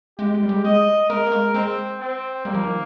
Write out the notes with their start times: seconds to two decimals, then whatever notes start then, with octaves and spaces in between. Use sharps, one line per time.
0.19 G#3 G4
0.34 G#3
0.43 G3
0.49 G#3
0.64 G#3 D#5
1.10 G#3 A#4
1.27 A#3
1.32 G#3
1.54 G#3 C4
2.00 C4
2.45 G3 A#3
2.54 F3
2.63 D#3